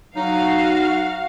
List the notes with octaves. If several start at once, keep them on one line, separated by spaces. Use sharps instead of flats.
F#3 D#4 F#4 F5